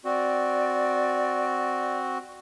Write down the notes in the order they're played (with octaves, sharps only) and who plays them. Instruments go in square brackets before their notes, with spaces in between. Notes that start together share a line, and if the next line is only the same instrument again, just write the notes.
[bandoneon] C4 F#4 [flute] D5